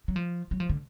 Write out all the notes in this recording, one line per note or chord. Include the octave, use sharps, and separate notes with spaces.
F#3
F3
F#3
F3
D3